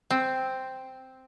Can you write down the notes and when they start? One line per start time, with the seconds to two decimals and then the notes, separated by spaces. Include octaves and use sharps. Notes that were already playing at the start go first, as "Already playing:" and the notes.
0.10 C4